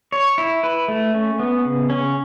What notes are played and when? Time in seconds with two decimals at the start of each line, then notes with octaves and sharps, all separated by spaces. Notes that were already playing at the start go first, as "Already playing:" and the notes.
0.12 C#5
0.38 E4
0.63 B4
0.88 A3
1.14 C#4
1.39 B3
1.65 C#3
1.90 C#4